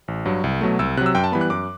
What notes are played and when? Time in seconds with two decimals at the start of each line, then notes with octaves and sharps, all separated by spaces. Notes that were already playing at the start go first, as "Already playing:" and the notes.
0.08 A1
0.25 G2 F#3
0.44 C2
0.61 B2 F#3 A3
0.79 C2 E6
0.97 C3 F#6
1.01 F#3
1.06 E6
1.15 F#2 G5
1.24 A5
1.32 E3 G3 B3 B5
1.41 F#6
1.50 F#2 D6